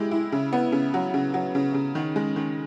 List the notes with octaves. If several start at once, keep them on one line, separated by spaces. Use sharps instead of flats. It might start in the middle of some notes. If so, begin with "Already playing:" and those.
Already playing: G#3 E4 G4
E4
C#3
B3
C#3
F#3
C#3
F#3
C#3
C#3
D#3
G#3
D#3